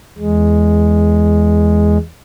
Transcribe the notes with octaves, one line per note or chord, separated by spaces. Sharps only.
E2 G#3